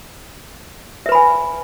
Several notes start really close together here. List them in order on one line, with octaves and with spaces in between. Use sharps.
E5 B4 B5 G#5